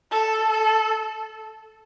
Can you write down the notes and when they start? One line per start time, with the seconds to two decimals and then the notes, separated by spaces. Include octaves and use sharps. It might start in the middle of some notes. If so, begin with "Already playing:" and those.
0.11 A4
0.50 A4